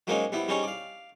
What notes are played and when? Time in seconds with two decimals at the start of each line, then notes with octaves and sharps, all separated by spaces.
0.07 F#3 G#3 A#3 C4 C#4 D#4
0.32 G3 B3 C4 E4
0.48 G3 C4 C#4 D#4 G#4 C#5
0.63 D5 F5